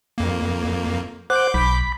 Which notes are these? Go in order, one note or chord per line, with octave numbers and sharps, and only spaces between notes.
F2 A#3
C5 F#5 D6 G6
B1 B5